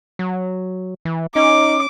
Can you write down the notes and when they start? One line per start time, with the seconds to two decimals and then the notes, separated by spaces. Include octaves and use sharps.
0.19 F#3
1.05 E3
1.36 C#4 D#4 D6